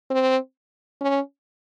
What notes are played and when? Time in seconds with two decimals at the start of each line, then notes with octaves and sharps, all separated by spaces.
0.10 C4
1.01 C#4